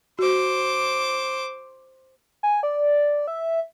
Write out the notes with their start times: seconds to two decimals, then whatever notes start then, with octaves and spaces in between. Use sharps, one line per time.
0.19 F#4 C5 D6
2.43 G#5
2.63 D5
3.27 E5